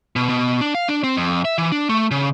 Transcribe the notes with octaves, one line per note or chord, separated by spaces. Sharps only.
B2
B2
D4
F5
D4
C4
F2
E5
E3
D4
A3
C#3